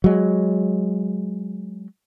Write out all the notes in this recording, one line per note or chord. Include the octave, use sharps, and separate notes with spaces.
F#3 G#3